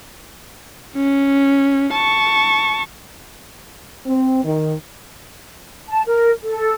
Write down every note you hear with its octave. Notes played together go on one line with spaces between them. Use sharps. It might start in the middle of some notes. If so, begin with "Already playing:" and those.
C#4
A5 C#6
C4
D#3
A5
A#4
A4